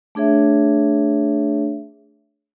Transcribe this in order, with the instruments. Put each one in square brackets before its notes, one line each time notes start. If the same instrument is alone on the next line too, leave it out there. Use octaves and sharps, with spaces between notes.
[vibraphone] A3 D4 G#4 C#5 E5